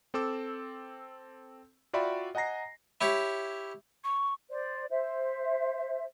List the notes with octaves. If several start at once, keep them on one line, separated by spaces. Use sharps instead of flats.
C4 A4 D6 E6
F4 F#4 D5 E5 G5 B5
D#5 F#5 G#5 A#5 A#6 C7
E4 G4 C#5
C#6
C5 D5
C5 E5